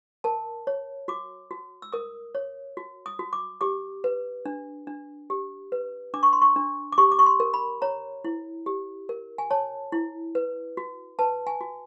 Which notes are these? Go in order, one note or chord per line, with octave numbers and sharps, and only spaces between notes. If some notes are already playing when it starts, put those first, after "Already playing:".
A#4 A5
C#5
F#4 D6
F#4
E6
A#4 D#6
C#5
F#4
D#6
F#4
D6
G4 D6
B4
D4
D4
G4
B4
D4 D6
C#6
C6
C#6
D4
D6
G4 C#6
D6
C#6
C6
A#4
B5
C#5 A#5
E4
G4
A#4
G#5
C#5 A5
E4
B4
F#4
B4 A5
G#5
F#4